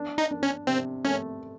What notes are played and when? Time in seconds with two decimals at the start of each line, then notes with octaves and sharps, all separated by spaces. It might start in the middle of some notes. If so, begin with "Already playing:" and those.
Already playing: D4
0.18 D#4
0.31 D4
0.43 C#4
0.67 C3 C4
1.05 A3 C#4